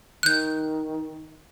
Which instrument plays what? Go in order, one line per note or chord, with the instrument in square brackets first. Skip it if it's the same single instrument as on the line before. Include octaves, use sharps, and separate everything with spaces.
[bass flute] D#3 [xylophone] F#6 G6